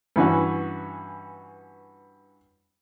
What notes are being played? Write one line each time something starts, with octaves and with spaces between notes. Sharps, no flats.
G2 E3 C#4 F#4